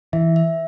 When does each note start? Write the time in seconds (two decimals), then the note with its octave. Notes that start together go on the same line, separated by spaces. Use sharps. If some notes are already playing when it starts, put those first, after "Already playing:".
0.13 E3 E5
0.36 E5